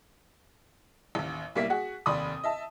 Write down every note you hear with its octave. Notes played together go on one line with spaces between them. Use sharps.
A1 D#2
B1 G3 A#3 E4 B6
F#4 G#4 F#5
F1 D#2 D5 B5 C6 D#6
D#5 E5 A5